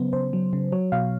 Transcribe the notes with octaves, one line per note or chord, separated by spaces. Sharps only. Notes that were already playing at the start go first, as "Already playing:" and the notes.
Already playing: C#3 F#3 B3 C5
C#3 C5
F#3
C#3
F#3 C#5
B2 F5